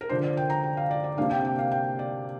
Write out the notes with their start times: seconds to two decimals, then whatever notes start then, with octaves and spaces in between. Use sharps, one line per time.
0.01 A#4
0.09 D3 F3 D4 C5
0.24 D5
0.37 G5
0.50 A#5
0.63 G5
0.77 F5
0.91 D5
1.04 D5
1.17 C3 A#3 D4 F5
1.31 G5
1.45 G5
1.59 F5
1.72 G5
1.99 D5